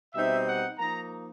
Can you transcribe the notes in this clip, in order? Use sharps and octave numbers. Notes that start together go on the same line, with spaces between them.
B2 G3 C4 D#4 E5
F#5
F3 A#3 D#4 A#5